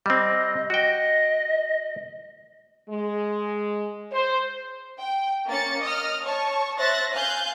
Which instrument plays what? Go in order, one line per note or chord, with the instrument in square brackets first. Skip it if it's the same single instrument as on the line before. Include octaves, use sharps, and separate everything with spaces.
[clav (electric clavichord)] G3 C4 [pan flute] D#5
[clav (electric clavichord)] F#4 G5 [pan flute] D#5
[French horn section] G#3
C5
[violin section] G5
A#3 C#4 A6 C#7
D#5 D#6 F6
C#5 A5 C#6
C5 E5 F#6 A6 A#6
F5 G#5 F#6 G6